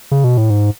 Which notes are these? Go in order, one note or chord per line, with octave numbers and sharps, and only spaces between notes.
C#3
B2
A2
G#2